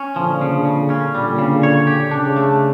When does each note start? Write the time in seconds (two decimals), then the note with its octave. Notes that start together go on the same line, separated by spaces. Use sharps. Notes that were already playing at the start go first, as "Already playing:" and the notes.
Already playing: C#4
0.16 A#2 D3 F3
0.41 C#3
0.65 C#3
0.90 C#4
1.13 A#2 D3 G3
1.39 C#3
1.63 C#5
1.87 G4
2.11 C#3 D4
2.36 A3